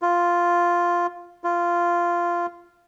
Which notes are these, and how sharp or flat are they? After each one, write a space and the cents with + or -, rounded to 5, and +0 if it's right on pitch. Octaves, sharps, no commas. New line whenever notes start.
F4 +0
F4 -10